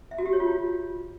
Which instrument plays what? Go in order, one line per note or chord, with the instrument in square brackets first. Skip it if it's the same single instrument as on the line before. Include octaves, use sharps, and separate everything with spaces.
[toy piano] E5
F#4
G4
C#5
F4